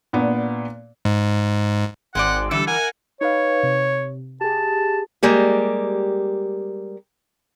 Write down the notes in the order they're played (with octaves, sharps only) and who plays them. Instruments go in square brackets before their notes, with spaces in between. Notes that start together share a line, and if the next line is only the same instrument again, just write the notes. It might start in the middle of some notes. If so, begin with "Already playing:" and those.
[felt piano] A#2 B3 D4
[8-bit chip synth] G#2
[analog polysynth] G#1 [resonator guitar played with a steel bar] G#3 C4 D5 [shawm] F#5
[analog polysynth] D3 G3 [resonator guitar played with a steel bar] E3 [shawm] A4
[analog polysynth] A#4 F#5 [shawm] G#5
[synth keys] D#4 B4 F5 [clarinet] C#5
[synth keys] C3
[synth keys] G4 G#4 [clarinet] A5
[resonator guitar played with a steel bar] G3 G#3 A#3 G4